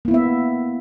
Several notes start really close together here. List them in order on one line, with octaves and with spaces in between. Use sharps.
A#3 E4 B3 E5